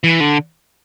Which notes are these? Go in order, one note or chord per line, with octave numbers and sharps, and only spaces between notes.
E3
D3